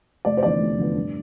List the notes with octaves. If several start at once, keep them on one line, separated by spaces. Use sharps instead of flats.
F1 D5
C5
E2 D3 F3 B3 D5
F1
E2 D3 F3 B3
G2